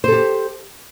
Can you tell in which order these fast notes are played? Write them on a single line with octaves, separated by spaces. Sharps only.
C5 A4 G4